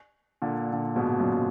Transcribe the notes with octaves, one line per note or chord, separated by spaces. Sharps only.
A#2 D3
A#2 D3
G#2 B2
F#2 A#2